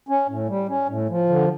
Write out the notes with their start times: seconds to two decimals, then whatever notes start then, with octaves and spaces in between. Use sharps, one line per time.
0.09 C#4
0.29 A2
0.49 G3
0.69 C#4
0.89 A2
1.09 F3
1.29 D3